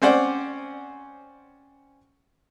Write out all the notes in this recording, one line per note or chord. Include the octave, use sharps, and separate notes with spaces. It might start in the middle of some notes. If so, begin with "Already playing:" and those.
C4 C#4 C5 D5 F#5